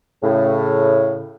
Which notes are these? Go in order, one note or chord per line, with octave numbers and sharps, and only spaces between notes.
A2 C#3